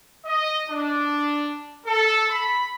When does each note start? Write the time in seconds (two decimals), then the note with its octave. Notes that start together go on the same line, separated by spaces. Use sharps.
0.24 D#5
0.68 D4
1.85 A4
2.29 B5